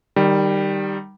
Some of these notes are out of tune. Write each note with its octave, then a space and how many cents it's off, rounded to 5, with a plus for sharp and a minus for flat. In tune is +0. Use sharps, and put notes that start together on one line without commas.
D#3 -20 G3 +0